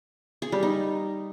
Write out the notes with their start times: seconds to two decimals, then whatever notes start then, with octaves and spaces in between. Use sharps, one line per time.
0.42 G#4
0.52 G3
0.63 D#4